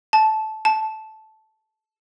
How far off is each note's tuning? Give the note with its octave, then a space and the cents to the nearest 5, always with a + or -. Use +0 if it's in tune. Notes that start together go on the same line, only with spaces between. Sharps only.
A5 -15
A5 -10